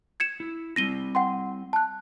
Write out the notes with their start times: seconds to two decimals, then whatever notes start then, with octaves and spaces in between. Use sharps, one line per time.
0.20 G#6 C#7 E7
0.40 E4
0.76 G3 C4 E4 A#6 D#7 G7
1.15 F#5 G5 C6
1.73 A5 F#6